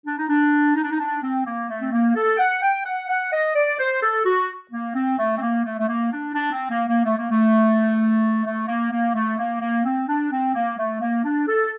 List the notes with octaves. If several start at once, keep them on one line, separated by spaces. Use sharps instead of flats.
D4
D#4
D4
D#4
D4
D#4
D4
C4
A#3
A3
C4
A#3
A4
G5
F#5
G5
F#5
F#5
D#5
D5
C5
A4
F#4
A#3
C4
A3
C4
A#3
A3
A3
A#3
D4
D4
C4
A#3
A#3
A3
A#3
A3
A3
A#3
A#3
A3
A#3
A#3
C4
D4
C4
A#3
A3
A#3
D4
A4